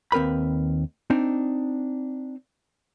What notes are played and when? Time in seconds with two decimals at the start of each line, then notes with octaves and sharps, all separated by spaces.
0.12 D#2 C4 A#4 B4 B5
1.10 C4 D4 D#4